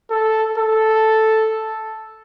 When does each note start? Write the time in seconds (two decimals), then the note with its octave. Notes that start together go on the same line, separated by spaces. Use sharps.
0.10 A4
0.57 A4